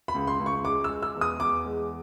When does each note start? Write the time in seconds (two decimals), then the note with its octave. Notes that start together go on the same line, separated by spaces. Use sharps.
0.08 B5
0.14 C#2
0.27 C6
0.39 C#2
0.46 C#6
0.65 G#3 D6
0.84 E6
0.90 G#3
1.03 E6
1.15 E2
1.21 D#6
1.40 E2 D6
1.66 G#3